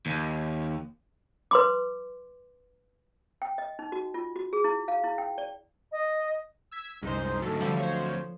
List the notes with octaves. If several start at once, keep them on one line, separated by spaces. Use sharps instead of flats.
D#2
B4 C6 D6
G5
D#5
D#4
F#4
F4
F#4
G#4
E4
F5
E4
G5
D5
D#5
E6 G#6 B6
C2 F#2 G#3 D#4 C5
D2 G#2 F#3 A4
D3 E3 F3 G3 E4
C5 C#5